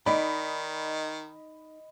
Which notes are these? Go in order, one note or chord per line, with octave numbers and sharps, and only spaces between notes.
D#3 D#4 D5 D#5 B5